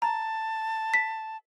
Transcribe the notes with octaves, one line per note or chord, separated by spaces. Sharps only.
A5 A#5
B6